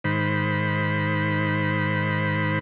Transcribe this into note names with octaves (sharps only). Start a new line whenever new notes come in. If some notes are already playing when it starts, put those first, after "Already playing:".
G#2 D#3 C5 B5